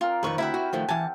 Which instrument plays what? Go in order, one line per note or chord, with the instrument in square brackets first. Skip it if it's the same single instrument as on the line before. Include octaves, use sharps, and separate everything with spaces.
[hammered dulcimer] C4 A#4 D5 [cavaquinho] F4
[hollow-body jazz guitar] F2 D#3 F3 [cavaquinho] B4 C#6
[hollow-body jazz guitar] D2 [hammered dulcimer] C3 G4 F#5 [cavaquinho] E4 E5 B5
[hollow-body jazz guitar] F#4
D#3 F3 A3
[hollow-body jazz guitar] E3 G#5 [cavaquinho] A5